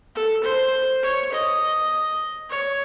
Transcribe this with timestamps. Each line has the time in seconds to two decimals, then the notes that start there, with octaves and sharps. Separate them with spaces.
0.15 A4
0.44 C5
1.03 C#5
1.32 D#5
2.50 C#5